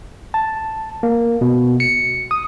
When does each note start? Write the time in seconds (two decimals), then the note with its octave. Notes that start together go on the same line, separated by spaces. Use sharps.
0.34 A5
1.03 A#3
1.41 B2
1.80 C#7
2.31 D#6